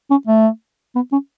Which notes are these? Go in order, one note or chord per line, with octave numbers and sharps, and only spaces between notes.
C#4
A3
B3
C#4